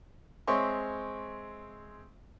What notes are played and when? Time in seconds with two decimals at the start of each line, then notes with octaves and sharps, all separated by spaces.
0.47 G#3 C4 C#5 E5 C6 C#6